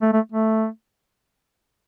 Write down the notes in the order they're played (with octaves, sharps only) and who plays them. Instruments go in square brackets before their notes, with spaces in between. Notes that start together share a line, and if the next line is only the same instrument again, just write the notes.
[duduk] A3
A3
A3